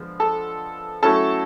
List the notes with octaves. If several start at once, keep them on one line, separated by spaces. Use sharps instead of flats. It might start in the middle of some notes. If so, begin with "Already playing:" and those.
Already playing: D3 F3 G#3 B3
A4 A5
F#3 A3 C#4 E4 A4 A5